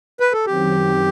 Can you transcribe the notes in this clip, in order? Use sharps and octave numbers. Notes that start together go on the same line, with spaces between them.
B4
A4
F#2 D#3 F#3 C4 G4